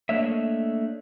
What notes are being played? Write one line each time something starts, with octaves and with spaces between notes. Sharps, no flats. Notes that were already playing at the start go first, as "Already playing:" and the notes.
A3 A#3 D4 C#5 D#5 E5